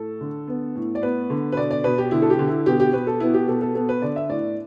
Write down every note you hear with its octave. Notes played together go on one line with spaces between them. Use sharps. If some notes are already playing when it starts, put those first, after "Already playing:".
Already playing: A2 A4
D3
B3
A2
D5
B3 B4
D3
B4
B2 D5
D5
B2 B4
G4
D3 E4
A4
G4
D3
E4
B2 G4
G4
B2 B4
A4
B3 E4
G4
B2 A4
A4
B3 A4
B4
D3 D5
E5
A2 D5